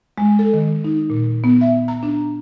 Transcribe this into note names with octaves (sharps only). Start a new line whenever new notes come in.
G#3
A4
D#3
D#4
A#2
B3
E5
A#5
D4